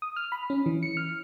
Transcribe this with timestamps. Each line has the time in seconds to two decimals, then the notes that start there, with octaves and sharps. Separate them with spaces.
0.02 D#6
0.16 F6
0.32 B5
0.50 C#4
0.66 E3
0.83 C#7
0.97 F6